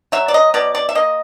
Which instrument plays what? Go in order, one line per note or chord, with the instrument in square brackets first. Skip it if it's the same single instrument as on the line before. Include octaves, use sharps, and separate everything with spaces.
[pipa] F#3 E5
D5
D#5
B2 D5
D5
E5
A#3 D#5